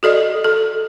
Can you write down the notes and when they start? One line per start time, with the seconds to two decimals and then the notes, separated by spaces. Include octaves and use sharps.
0.03 F#4 A4 D5 D#5
0.44 A4